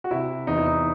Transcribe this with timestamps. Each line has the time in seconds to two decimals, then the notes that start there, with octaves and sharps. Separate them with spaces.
0.04 F#4
0.11 C3 E4
0.47 E2 D#4
0.57 E4
0.66 D#4